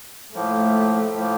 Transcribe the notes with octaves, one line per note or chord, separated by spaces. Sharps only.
A2 F3 A3 A#3
A2 F3 A#3